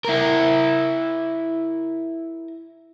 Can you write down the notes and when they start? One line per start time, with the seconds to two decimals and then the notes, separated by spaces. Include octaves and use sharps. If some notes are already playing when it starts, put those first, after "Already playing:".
0.05 E4 A#4